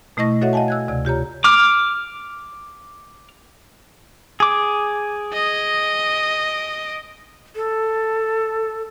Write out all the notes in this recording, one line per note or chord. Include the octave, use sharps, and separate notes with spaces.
B2 A3 E4 D#5 C#6 A#6
F#4 A4 C#5 D#5 E5 F#5
D#5 F5 F#5 G#5 A5
E6 F#6 G#6
D2 C3 D5 G#6
F4 G4 C#5 A#5
D6 F6
G#4 D6
D#5
A4